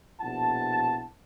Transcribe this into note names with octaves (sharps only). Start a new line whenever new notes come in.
A#1 B2 E4 F#5 A5